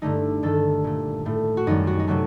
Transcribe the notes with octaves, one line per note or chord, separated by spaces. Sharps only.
G2 D3 A3 D#4
G2 D#3 A3 A4
A#2 A3
A2 A3
F#4
F#2 D#3 G3 D#4
F#4
D#4
C3 F#3 A3 F#4